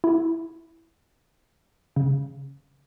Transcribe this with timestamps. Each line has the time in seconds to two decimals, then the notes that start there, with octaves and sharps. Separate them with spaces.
0.04 E4
1.96 C#3